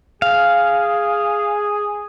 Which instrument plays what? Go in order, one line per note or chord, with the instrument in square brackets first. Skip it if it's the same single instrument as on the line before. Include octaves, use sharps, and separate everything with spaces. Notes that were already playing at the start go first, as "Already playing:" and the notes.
[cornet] G#4 [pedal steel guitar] F5